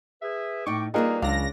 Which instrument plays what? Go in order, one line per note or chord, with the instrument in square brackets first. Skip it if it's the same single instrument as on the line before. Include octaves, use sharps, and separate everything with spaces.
[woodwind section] G#4 B4 E5
[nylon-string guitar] A2 D#4 [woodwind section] G5 C#6 D6
[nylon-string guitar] G3 A#3 F4 [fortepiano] D#4 G#4 A#4 [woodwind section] B4
[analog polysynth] C#2 A#6 [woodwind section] F#3 [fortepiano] D4 [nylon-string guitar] F5